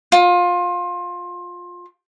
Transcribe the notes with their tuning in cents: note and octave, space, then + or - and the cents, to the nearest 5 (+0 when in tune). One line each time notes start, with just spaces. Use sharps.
F4 +20